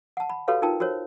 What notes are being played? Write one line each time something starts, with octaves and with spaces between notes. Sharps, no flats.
F#5 A5
B5
F#4 G4 A4 B4 C#5 F5
D#4 F4 A#4 G5 A5 A#5
F#4 A#4 C5 C#5